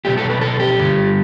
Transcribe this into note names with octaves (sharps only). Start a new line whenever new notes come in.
B2 F#3 A3 G4
A4
B4
A4
G4
G2 D3 G3